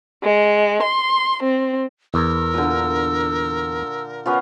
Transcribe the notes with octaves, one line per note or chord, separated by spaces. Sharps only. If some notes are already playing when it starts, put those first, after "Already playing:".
G#3
C6
C4
E2 A#4 E6
A#2 D3
B3 C#4 F4